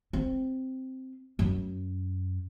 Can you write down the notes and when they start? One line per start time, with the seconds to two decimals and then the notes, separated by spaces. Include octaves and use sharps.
0.13 C4
1.39 F#2